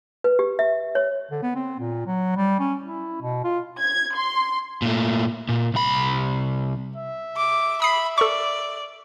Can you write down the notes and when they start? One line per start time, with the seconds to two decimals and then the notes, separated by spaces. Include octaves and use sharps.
0.24 B4
0.39 G4
0.59 E5
0.95 C#5
1.31 D3
1.43 B3
1.55 C4
1.80 A#2
2.06 F#3
2.36 G3
2.59 C#4
2.82 E4
3.22 B2
3.44 F4
3.80 G#6
4.16 C6
4.82 A#2 A3
5.49 A#2
5.74 C2 B5
6.96 E5
7.37 D6
7.82 B5 D#6 C7
8.18 A4 D5 C#6